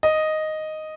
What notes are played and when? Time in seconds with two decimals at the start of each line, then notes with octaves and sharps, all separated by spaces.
0.03 D#5